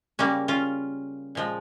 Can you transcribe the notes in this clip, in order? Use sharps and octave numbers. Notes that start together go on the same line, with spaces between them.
C#3 G3 A#3 C#4
C#4 F4
A#2 F3 G#3